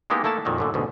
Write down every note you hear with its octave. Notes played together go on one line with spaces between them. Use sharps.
G#3 A#3 B3 D#4 E4 G4
A3 A#3 E4 A4 A5
F2 A#2 D#3 F#3
F#2 A2 D3
D2 G#2 B2